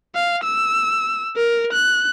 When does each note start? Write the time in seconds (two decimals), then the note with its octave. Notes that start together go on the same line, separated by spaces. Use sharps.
0.15 F5
0.44 E6
1.37 A#4
1.73 F#6